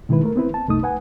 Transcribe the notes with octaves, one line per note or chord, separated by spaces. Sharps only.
B2 D#3 G#3 E4 B4
A3 A#4
B3 C4 E4 B4
A5
C2 F#2 A3 D#4 D#6
B4 F#5 G#5